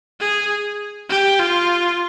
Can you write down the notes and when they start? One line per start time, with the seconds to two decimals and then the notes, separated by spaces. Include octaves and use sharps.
0.20 G#4
1.10 G4
1.39 F4